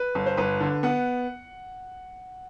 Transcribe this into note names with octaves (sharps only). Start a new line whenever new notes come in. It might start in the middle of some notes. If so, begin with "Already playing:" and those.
Already playing: B4
G1
C5
G1 B4
D3
B3 F#5